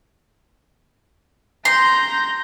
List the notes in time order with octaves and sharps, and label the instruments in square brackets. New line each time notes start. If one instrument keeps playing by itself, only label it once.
[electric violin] A#5 G6 [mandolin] C6